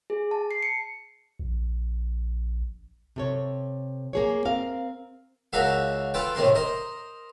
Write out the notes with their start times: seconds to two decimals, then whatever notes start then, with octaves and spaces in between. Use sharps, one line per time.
0.10 G#4
0.31 A5
0.51 C7
0.63 C#7
1.39 A#1
3.16 C3 A4 C#5
4.13 A#3 G#4 C#5
4.45 C4 A#4 F5
5.53 C#2 F#4 A#4 E5 F5
6.14 F4 A4 B4 G5
6.35 A2 C3 D#3 A#4 C6
6.55 A#4 C5 D#5